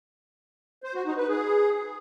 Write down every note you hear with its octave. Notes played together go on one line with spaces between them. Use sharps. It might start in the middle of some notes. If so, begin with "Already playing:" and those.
C5
F#4
D#4
B4
G#4